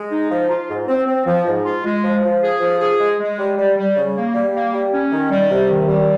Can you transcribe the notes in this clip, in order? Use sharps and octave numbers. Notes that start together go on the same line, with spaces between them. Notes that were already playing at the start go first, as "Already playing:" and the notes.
Already playing: G#3
D#4
F3
F4
G#2
C4
C4
F3
G#2
F4
G#3
F3
F3
G#4
F3
G#4
G#3
G#3
G3
G3
G3
C#3
A#3
G3
A#3
G3
C#4
D#3
G3
C3
D#3
G3